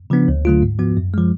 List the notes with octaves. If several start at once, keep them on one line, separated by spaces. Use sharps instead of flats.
C#3 F3 B3 D4
D2
D3 F#3 A3 F4
G#2
F3 B3 F#4
F#2
F3 G#3